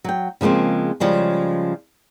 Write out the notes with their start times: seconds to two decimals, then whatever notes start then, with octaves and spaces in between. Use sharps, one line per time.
0.04 F#3 G5
0.41 C#3 F3 G#3 A#3 C4
1.00 C#3 F3 G3 G#3